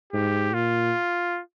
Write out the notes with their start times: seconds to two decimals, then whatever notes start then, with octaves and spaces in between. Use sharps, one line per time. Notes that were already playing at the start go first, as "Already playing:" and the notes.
0.13 G#2 G4
0.54 A#2 F4